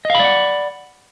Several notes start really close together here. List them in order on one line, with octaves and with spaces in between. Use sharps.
D#5 F5 B5 D5 F#5